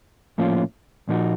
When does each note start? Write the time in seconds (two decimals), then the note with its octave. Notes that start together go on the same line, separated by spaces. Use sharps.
0.38 A2 F3 A#3 C#4 F4
1.09 A#2 F3 A#3 D#4 F#4